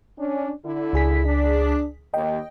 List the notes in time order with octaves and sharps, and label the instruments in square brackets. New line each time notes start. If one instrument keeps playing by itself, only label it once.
[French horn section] C#4 D4
D3 E4
[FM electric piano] C#2 G#4 B6
[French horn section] D4
[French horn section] D#2 [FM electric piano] D#5 G5